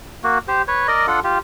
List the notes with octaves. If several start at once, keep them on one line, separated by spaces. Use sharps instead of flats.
A#3 F#4
G4 C5
B4 C#5
A#4 D5 D#5
D4 F4 A4 F#5
F4 G4